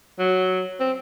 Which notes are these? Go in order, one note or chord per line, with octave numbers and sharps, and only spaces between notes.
F#3
C4